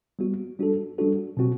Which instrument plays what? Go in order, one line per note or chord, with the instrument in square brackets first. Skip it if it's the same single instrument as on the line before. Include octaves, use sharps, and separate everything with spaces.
[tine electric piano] G3 B3 F#4
G3 D4 F#4 A4
G3 D4 F#4 A4
B2 F#3 C4 F#4